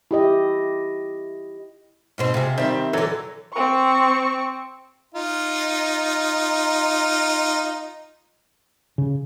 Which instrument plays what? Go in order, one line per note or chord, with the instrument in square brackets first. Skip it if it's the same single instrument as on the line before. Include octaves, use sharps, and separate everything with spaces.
[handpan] E4 G4 D#5
[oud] G#2 B2 C4
[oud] C3 G#4 [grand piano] F4
[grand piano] D#3 C4 [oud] G3 E5
[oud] D3 A4 [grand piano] E3 F#3
[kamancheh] C4 C#6
[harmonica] D#4 F4
[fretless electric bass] C#3